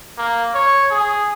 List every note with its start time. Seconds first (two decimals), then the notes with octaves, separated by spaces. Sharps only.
0.18 A#3
0.55 C#5
0.90 G#4